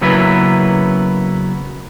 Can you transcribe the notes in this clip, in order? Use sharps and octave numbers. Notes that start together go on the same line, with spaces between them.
C#3 F#3 A#3 B3 E4 B4